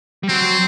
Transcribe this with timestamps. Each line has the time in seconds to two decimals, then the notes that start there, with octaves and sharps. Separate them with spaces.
0.23 G3
0.29 F#3 C4